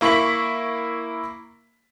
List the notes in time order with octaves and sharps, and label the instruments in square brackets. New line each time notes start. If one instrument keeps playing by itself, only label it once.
[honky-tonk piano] A#3 E4 C#6 B6 F#7